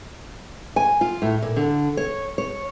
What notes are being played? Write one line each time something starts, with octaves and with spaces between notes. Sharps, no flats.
G#5
F4
A2
A#2
D3
C#5
C#5